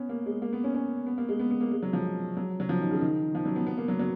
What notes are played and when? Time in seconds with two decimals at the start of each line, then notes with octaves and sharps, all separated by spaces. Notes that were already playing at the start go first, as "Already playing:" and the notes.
Already playing: B3 C#4
0.09 A#3
0.26 G#3
0.42 A#3
0.53 B3
0.64 C#4
0.74 C#4
1.07 B3
1.18 A#3
1.29 G#3
1.39 B3
1.51 B3
1.61 A#3
1.71 G#3
1.83 F#3
1.93 F3
2.37 F#3
2.60 F#3
2.69 F3
2.81 D#3
2.91 C#3
3.01 D#3
3.35 F3
3.46 F#3
3.56 B3
3.67 B3
3.78 A#3
3.88 F#3
3.99 F#3